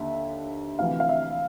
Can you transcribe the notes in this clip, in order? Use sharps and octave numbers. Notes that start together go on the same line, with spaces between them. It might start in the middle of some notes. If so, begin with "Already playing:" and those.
Already playing: D#2 D3 E5
D2 C3 E3 F5
F5
E5